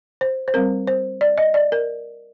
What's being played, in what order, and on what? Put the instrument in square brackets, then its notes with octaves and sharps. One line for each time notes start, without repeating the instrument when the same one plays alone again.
[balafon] C5
C5
G3 C4 A#4
C5
D5
D#5
D5
A#4